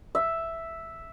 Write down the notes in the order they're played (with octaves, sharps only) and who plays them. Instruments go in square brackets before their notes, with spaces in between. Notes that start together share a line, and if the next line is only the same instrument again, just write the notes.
[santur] E5